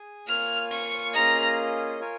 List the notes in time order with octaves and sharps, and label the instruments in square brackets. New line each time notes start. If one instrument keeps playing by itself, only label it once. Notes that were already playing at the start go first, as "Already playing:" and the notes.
Already playing: [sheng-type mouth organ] G#4 G#5
[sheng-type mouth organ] A#3 F4 C#5 F5 G#5 [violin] F6
[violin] C#6
[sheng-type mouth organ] A#3 C#4 F4 G#4 D#5 [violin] A#5
[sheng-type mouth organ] F4 A#4 C#5 G#5